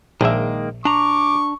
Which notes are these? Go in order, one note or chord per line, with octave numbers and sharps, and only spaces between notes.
A#1 D#3 G#3 A#3 E5
D4 A#5 C#6 D6